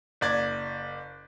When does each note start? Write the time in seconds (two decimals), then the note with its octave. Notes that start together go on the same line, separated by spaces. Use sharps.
0.21 F#1 D5 G#6